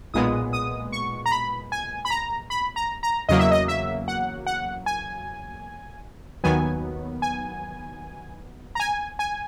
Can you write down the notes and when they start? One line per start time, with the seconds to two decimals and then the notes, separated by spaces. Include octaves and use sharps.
0.14 B1 A#2 G#3 B3 D#6
0.53 D#6
0.92 C#6
1.26 A#5
1.32 B5
1.72 G#5
2.05 B5
2.10 A#5
2.50 B5
2.76 A#5
3.03 A#5
3.29 E2 C#3 F#3 A#3 D#5
3.39 E5
3.51 D#5
3.68 E5
4.08 F#5
4.47 F#5
4.86 G#5
6.44 D#2 D#3 F#3 B3 G#5
7.22 G#5
8.75 A#5
8.80 G#5
9.19 G#5